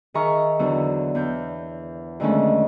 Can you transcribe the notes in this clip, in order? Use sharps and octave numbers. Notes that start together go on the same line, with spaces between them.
D#3 G#4 E5 A#5 C#6 F6
E2 D3 F#3
E2 G6
F2 D3 D#3 G#3 A3 C#4